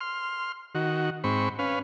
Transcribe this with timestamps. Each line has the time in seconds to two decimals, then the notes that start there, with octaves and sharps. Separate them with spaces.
0.01 C6 F6
0.75 D#3 F#4
1.24 G#2 C4 B5 C#6
1.59 C#4 B4 F5